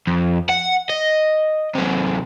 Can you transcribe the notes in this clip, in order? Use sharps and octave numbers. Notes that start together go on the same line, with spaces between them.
F2
F#5
D#5
C3 F#3